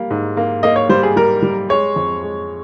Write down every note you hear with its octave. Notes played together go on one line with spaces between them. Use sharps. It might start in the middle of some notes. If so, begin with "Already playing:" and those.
Already playing: G3 A#3
G#2
A#3
A#3 D#5
C#5
G3 C5
G#4
G3 A#4
G3
G#3 C#5
F2
G#3